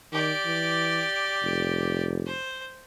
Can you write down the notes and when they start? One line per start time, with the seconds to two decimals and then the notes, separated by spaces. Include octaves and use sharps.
0.13 D#3 G4 D5
0.45 E3
1.43 F1
2.27 C5